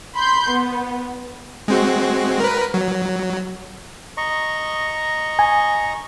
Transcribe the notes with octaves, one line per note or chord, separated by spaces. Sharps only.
B5 C6 G6
B3
G#3 C4 F#4
A#4 B4
F#3
D#5 A#5 C#6
G#5